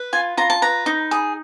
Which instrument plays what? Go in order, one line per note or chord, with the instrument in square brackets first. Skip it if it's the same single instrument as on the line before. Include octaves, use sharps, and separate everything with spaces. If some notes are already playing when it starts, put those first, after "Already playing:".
Already playing: [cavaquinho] B4
F4 G#5
F4 A#5
A5
B4 A#5
D#4
G#4